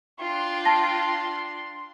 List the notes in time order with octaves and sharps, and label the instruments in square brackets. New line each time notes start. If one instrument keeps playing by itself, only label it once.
[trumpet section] D4 C6 [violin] F4 G5
[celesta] A5 A#6